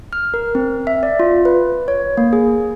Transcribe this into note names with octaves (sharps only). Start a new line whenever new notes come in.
F6
A#4
C4
E5
D5
F4
B4
C#5
A#3
G#4